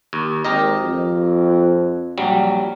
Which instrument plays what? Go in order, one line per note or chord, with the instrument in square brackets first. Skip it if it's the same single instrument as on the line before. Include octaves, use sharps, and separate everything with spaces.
[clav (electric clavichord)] D#2
[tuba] G#1 [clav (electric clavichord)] G4 A#4 D#5
[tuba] F2
[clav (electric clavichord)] A#1 F#3 G3